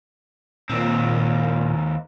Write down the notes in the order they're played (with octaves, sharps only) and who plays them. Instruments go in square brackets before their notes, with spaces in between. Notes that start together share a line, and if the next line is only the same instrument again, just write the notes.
[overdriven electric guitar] D#2 C4 [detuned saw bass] A#2